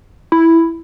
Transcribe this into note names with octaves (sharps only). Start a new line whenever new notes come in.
E4